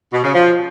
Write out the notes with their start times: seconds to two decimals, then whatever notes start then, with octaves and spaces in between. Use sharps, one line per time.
0.13 B2
0.24 C#3
0.35 F3